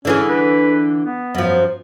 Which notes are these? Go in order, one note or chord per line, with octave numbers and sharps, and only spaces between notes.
D3 E3 C#4 G#4
B4
B3
F#2 F3